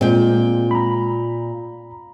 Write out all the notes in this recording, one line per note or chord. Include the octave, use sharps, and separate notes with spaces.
A#2 G#3 C4 G5
A#5 B5